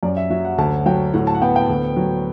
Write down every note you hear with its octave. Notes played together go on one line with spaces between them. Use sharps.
F#2 D5
E5
F#3 E5
F#5
D2 A5
F#3 G5
A2 F#5
A5
F#5
B3 G5
G5
D2
F#3